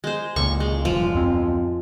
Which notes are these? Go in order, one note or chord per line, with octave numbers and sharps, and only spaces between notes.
G#3 C5
C#2 A#2 C#6
G#3
E1 G2 F3
D1 F2 C4